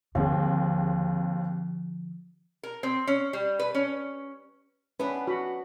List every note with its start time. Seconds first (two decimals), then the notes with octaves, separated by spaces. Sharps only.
0.15 D#2 D3 F3 C4 G#4
2.63 A#4
2.83 C4
3.07 C#4
3.33 G3
3.59 B4
3.75 C#4
4.99 B3 C#4 D4 B4
5.27 F#4 B5